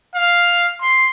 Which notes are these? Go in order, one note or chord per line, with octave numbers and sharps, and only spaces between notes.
F5
C6